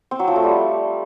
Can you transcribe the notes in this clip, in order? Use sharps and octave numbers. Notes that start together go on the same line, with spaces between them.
C4
F#3
F3
A3
G3